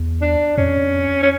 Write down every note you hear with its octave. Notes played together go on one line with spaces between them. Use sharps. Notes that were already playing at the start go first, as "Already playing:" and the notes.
Already playing: E2
D4
F2 C#4
C#4